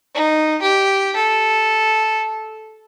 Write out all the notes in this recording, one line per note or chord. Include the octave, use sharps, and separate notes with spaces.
D#4
G4
A4